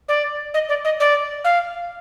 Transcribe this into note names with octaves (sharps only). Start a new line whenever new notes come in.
D5
D#5
D5
D#5
D5
F5